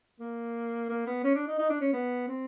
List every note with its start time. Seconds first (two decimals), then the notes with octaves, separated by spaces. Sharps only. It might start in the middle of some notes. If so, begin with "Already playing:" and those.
0.20 A#3
0.89 A#3
1.06 B3
1.24 C#4
1.35 D4
1.47 D#4
1.59 D#4
1.70 D4
1.81 C#4
1.93 B3
2.28 C4